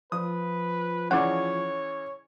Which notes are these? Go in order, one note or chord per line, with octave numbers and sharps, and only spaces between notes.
F3 B4 D#6
C#3 E3 C#5 D5 F#5